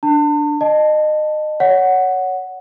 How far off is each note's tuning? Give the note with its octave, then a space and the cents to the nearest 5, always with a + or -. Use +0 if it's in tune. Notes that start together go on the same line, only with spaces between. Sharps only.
D4 +0 A5 +35
D#5 -25 A5 +0
C#5 +15 F#5 +0